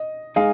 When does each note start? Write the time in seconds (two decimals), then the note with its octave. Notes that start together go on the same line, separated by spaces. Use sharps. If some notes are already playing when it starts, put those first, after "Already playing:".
Already playing: D#5
0.36 G#3 D#4 G#4 F5